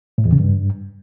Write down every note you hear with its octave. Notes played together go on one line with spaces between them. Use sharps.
A2
E2
C#3
G2